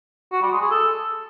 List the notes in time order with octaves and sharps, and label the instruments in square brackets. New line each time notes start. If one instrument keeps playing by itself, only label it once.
[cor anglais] F#4
G3
G#3
G#4
A4